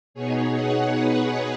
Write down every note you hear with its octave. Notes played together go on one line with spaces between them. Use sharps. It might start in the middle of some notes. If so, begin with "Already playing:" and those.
B2 B3 D#4 G#4 C#5
C#5 F#5
B4